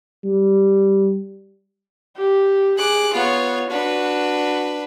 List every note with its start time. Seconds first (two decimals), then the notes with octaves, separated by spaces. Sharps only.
0.24 G3
2.17 G4
2.78 G#4 D6 F#6
3.14 B3 F4 C#5
3.70 D4 F#4 B4